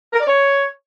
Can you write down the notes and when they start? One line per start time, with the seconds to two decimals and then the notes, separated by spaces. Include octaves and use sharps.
0.13 A#4
0.20 D5
0.27 C#5